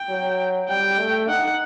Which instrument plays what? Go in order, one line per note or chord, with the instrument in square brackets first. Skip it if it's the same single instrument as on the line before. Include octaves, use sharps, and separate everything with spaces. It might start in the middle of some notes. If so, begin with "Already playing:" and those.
Already playing: [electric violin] G5
[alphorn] F#3
[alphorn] G3 [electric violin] G5
[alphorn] A3
[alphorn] D#4 [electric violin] F#5